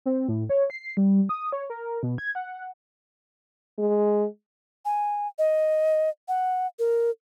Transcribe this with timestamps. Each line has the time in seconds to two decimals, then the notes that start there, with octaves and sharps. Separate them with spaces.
0.06 C4
0.29 A2
0.49 C#5
0.70 C7
0.97 G3
1.29 D#6
1.52 C#5
1.70 A#4
2.03 B2
2.18 G#6
2.35 F#5
3.79 G#3
4.85 G#5
5.39 D#5
6.28 F#5
6.79 A#4